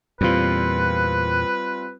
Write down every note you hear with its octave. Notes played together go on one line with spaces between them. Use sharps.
E2 A#2 G3 C4 F4 B4